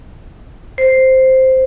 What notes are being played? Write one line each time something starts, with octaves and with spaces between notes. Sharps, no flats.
C5